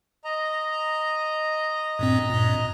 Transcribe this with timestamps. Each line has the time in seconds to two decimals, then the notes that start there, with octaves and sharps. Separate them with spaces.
0.24 D#5 A#5
1.99 G2 A#2 C4
2.30 G2 A#2